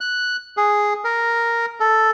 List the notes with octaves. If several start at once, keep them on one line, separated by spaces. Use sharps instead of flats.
F#6
G#4
A#4
A4